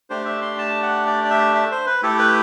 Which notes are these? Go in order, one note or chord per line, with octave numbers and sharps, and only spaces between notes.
A3 D4 G4 C5
E5
C6
A5
F#5
D5
D5
E5
E5
C5
B4
A3 E4 G4 A4
B4